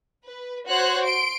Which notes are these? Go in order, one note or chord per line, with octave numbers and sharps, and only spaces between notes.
B4
F#4 C5 C#5 F#6
C6 D7